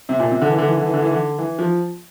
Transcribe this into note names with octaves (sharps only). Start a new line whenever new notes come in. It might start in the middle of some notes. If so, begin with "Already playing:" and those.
C3
A#2
C3
D3
E3
D3
E3
D3
E3
D3
E3
D3
E3
F3